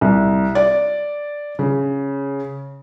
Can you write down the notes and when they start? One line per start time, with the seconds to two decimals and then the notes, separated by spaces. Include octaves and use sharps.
0.01 C2
0.55 D5
1.59 C#3